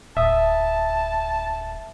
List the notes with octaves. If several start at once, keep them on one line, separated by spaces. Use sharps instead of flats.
D1 E5 A5 D#6